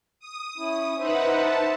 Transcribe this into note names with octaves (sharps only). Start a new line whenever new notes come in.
D#6
C#4 E4
D#4 B4 C5 E5 F#5
A5